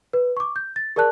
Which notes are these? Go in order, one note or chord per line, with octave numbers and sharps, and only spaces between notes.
B4
C#6 D6
G6
A6
G#4 A#4 D5 A5 F#6